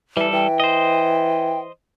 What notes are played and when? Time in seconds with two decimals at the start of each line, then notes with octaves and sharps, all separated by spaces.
0.17 E3 G3 A4
0.33 E3 G5
0.60 C5 D#5